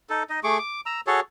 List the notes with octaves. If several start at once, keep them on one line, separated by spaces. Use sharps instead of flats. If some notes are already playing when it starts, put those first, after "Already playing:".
D#4 A4
D#4 D#5
A3 G#4 C#6 D6
D6
A#5 E6
F#4 G#4 A4 C#5